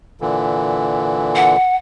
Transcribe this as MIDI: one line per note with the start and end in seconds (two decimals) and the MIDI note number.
0.21 1.56 46
0.21 1.56 50
0.21 1.56 52
1.35 1.76 78